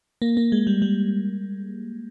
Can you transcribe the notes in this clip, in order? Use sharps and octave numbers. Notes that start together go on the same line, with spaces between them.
A#3
A#3
G#3
G3
G3